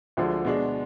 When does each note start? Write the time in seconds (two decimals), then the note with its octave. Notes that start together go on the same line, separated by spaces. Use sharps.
0.17 D2 D3 F3 G#3
0.45 B2 G#3 D4